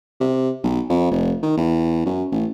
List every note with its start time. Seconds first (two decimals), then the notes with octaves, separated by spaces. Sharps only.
0.20 C3
0.63 B1
0.90 F2
1.11 F1
1.43 D#3
1.57 E2
2.05 F#2
2.31 A1